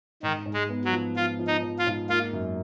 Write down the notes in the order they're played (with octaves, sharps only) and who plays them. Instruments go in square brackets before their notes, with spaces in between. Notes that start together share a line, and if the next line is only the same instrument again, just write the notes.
[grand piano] G#2 [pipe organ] D#3
[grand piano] G#2
[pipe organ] G#3
[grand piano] B3
[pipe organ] F#3
[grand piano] F3
[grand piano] F3 [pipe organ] F4
[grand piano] F3
[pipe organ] D#4
[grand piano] F3
[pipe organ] F4
[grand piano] G#2
[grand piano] A#3 [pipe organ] F4
[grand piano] F#2